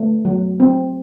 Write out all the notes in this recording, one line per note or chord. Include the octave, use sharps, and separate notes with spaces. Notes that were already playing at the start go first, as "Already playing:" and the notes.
Already playing: A3
F#3
C4